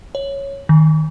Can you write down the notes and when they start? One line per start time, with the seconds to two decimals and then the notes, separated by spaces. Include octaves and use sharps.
0.15 C#5
0.69 D#3